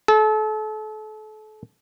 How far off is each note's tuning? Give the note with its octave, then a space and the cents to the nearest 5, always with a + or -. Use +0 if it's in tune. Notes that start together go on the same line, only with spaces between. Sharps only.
A4 -35